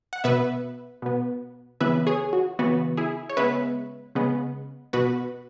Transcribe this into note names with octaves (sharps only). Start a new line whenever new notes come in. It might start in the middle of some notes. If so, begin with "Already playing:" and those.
F#5
B2 B3 B4 E5
B2 B3
C#3 E3 B3 B4 E5
G#4 C#5
F#4
C#3 E3 B3 F#4
E4 G#4
C#5
C#3 G#3 B3 B4 E5
C#3 G#3 B3
B2 B3 F#4 B4